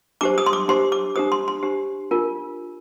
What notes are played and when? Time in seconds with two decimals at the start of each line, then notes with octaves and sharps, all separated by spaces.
0.21 D4 G4 C5 D6
0.38 D#6
0.46 C6
0.53 D6
0.68 D4 G4 C5 C6
0.92 D6
1.16 D4 G4 C5 D#6
1.32 C6
1.48 C6
1.63 D4 G4 C5
2.11 D4 F4 A#4